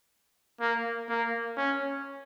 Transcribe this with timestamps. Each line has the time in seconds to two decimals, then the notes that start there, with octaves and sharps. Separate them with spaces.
0.61 A#3
1.09 A#3
1.57 C#4